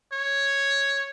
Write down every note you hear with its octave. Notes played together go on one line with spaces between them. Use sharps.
C#5